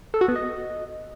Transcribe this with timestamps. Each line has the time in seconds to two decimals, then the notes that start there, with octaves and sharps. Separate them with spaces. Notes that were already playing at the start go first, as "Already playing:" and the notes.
0.14 A4
0.21 F#4
0.28 B3
0.36 D#5